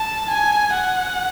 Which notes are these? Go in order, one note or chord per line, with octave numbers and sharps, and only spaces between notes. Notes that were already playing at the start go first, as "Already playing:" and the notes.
Already playing: A5
G#5
F#5